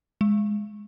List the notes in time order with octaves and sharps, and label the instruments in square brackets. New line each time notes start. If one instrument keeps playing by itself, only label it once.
[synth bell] G#3